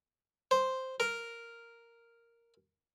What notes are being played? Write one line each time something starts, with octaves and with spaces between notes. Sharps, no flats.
C5
A#4